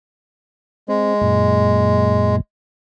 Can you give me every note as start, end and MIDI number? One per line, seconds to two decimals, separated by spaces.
0.88 2.36 56
0.88 1.14 60
1.21 2.41 42
1.21 2.41 46